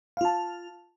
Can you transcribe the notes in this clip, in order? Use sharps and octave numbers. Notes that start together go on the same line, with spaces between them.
F4 F5 A5